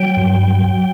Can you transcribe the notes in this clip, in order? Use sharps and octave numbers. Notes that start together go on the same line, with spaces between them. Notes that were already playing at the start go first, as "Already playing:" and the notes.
Already playing: F#3 G5
G2
F#3